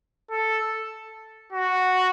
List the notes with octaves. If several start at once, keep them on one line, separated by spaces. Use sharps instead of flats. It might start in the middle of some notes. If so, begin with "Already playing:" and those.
A4
F#4